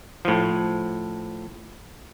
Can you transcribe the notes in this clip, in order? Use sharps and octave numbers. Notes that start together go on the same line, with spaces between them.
A2 F3